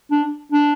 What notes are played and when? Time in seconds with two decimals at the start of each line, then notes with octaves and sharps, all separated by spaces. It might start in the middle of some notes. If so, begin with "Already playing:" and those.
0.11 D4
0.52 D4